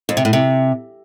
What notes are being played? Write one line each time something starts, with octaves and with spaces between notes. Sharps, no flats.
F2
C3
A2
C3